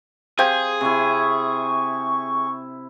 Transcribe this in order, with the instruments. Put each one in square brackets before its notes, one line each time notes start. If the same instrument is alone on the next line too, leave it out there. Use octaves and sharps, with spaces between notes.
[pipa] C4 G4 F5 [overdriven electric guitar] G#4 [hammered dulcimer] C5
[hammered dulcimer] C3 E4 [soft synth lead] C#6